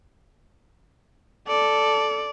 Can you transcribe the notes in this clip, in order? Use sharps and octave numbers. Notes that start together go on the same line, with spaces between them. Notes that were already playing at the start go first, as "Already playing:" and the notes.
A4 D5